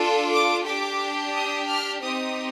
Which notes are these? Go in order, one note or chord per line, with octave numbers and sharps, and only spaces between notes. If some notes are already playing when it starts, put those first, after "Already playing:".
Already playing: D4 F4 A4
D6
D4 G4 D6
D#6
F6
C4 D#4 G4 D#6